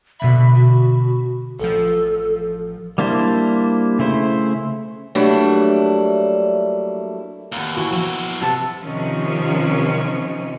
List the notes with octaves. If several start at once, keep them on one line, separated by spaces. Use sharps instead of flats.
B2 D3 E5 B5
F#4
A1 F3 A4
G3 A#3 D4 E4 C5
C#3 A3 E4 C5
F#3 G3 A3 A#3 D4 E4
D#2 A#3 B3
E3 F#4
F3 F#3 E4
C3 B3 A4 A5
C3 D#3 F3 C#4